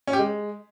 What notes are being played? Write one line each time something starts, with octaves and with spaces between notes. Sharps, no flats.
C#4
G4
G#3